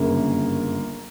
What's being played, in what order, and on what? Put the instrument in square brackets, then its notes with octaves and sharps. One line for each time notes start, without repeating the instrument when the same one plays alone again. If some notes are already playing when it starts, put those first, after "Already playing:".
Already playing: [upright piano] G1 F#2 C#3 A#3